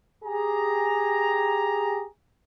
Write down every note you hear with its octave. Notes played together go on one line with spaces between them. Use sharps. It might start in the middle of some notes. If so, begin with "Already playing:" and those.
G4 G#4 A#5